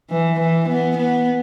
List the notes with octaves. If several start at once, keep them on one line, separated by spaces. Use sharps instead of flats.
E3
E3
B3
B3